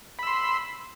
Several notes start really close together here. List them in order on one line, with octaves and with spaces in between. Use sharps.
B5 E6 C6